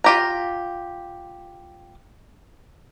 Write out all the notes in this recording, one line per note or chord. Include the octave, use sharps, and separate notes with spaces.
F4 G4 A#5